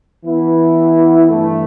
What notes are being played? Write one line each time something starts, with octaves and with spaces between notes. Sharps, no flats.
E3 B3 E4 B4
G2 E3 A3